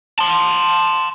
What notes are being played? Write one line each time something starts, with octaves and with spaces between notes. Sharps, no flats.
A5 C6